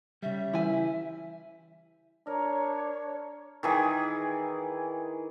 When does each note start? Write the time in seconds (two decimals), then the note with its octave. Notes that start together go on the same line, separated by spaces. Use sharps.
0.22 C#3 G3 E5
0.53 E3 E4 G#5
2.27 D4 A#4 C#5
3.63 D#3 E3 G#4